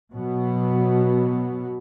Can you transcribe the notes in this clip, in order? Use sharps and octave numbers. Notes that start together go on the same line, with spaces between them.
B2 F#3 B3